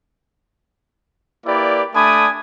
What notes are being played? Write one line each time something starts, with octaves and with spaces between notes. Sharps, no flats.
A#3 E4 G4 B4 D5
A3 D4 G#5 B5 D6 D#6